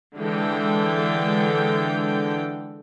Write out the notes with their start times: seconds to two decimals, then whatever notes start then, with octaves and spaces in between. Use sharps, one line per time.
0.16 D3 E3 G#3 A4 G5